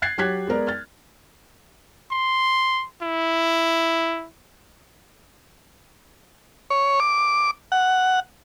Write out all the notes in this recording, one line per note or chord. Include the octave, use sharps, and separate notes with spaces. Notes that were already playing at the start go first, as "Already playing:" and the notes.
F#6 G#6 A6 C7
F#3 G4 C#5 F#6 G#6 B6
G#3 B3 A#4 D5
F6 A6
C6
E4
C#5
D6
F#5